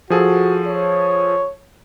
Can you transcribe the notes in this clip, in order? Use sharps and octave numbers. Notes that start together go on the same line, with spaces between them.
F3 F#4 G#4 A4
C#5